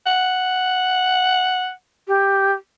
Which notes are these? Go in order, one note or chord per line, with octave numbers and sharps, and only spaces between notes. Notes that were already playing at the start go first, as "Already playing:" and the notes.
F#5
G4